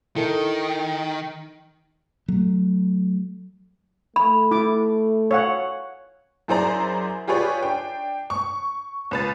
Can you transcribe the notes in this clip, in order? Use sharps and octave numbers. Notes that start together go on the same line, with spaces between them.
D#3 E4 A4 A#4
F#3 A3
A3 B5
E4 D6
C#5 F5 F#5
F#2 E4 G#4 C5 D5 A#5
F4 G4 G#4 B4 C#5 D5
D4 G5
C#6
C#2 B4 A6